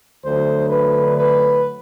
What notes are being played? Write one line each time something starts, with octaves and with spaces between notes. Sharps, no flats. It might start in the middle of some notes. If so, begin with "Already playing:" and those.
D2 D3 F#3 C5
B4
B4